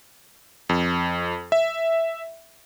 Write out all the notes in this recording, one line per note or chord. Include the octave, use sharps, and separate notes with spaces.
F2
E5